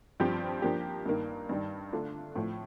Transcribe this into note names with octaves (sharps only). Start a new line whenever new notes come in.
G2 F3 C4 G4
F3 A#3 D4 G4
G2 D#3 A#3
G2 D#3 G3
D3 A3 D4 F4
A2 F3 A3